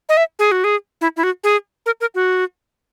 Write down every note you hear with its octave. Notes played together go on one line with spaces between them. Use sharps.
D#5
E5
G#4
F#4
G#4
E4
E4
F#4
G#4
A#4
A#4
F#4